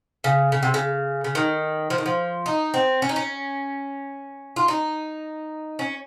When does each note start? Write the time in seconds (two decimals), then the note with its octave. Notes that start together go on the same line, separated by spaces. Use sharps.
0.24 C#3
0.52 C#3
0.63 C3
0.74 C#3
1.24 C#3
1.35 D#3
1.90 F3
1.98 D#3
2.06 F3
2.46 D#4
2.74 C4
3.02 C#4
3.09 D#4
3.16 C#4
4.56 F4
4.68 D#4
5.79 C#4